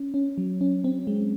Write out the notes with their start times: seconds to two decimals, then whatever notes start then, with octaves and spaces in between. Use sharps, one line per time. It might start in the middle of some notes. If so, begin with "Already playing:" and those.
Already playing: C#4
0.14 C#4
0.38 F#3
0.61 C#4
0.84 C4
1.07 G#3